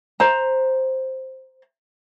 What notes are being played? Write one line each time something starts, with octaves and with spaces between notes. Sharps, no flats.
C5 A#5